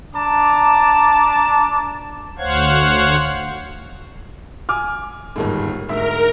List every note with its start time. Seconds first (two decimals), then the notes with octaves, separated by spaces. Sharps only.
0.15 D4 A5 A#5 D6
2.38 D2 C5 C#5 F5 F#5 G#6
4.69 G#5 D6 F6
5.36 G1 D#2 G#2
5.89 D2 G#2 A#4 E5